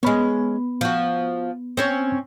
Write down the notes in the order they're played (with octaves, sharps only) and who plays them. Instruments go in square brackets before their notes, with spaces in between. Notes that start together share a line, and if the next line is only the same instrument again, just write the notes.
[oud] G#3 C#4 [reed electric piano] B3 B5
[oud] F3 F#4
C4 C#4 C#5